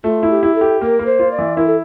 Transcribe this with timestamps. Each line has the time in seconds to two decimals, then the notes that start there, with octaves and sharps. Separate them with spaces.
0.04 A3 F4
0.23 E4
0.30 G4
0.43 E4
0.55 A4
0.61 G4
0.81 A#3 A#4
0.99 A#3
1.06 C5
1.19 F4
1.31 D5
1.39 E3
1.57 E4 A#4
1.66 A4